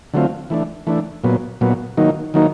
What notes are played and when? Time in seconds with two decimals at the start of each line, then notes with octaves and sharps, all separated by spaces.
0.14 D3 F#3 A3 C4 F4
0.50 E3 A3 D4
0.87 E3 A3 D4
1.24 A#2 F#3 B3
1.61 A#2 F#3 B3
1.97 D#3 F#3 A#3 D#4
2.34 D#3 F#3 A#3 D#4